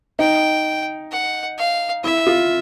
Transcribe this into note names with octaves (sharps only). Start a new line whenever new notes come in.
D#4 G5
F#5
F5
E4 E5
F4